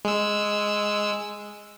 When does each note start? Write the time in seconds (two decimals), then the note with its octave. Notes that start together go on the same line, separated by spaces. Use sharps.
0.05 G#3 E6